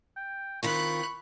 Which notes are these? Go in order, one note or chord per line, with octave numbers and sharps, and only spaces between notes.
G5
D#3 C4 F4 B5 C#6 F#6